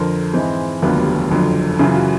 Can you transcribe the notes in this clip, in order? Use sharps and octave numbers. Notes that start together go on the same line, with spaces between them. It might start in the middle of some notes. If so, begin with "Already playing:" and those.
Already playing: F2 D3 F3 A#4 C5
G#2 E3 G#3 C4
F1 D#2 D3 F#3 B3 F4 G4
F#1 F2 D3 F#3
F#2 C#3 E3 F4
F#4